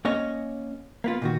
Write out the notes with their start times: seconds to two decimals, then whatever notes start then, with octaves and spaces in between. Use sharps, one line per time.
0.05 A#3 C#4 C#5 D#5
1.04 A#3 B3 F4
1.22 A#2 D#3 F#4